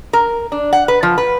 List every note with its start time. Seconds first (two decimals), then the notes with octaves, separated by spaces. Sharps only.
0.13 A#4
0.52 D4
0.73 F#5
0.88 B4
1.03 F3
1.18 B4